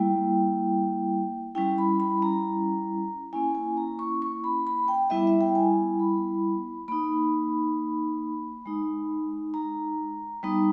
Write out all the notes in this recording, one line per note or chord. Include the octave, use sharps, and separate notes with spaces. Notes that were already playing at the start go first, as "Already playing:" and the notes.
Already playing: G3 A#3 E4 G5
G3 C#4 E4 G5
B5
B5
A#5
A#3 C#4 E4 G#5
G#5
A#5
C#6
C#6
B5
B5
G5
G3 B3 E4 E5
E5
G5
G#5
B5
A#3 D#4 B5
G#3 D#4
A#5
G3 B3 D#4